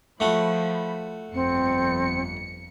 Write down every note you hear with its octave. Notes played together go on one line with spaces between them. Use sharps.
F3 A3 F#4 B5
G1 F2 C4 C#7